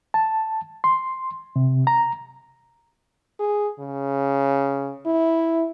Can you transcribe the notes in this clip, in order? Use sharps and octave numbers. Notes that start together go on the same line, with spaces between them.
A5
C6
C3
A#5
G#4
C#3
E4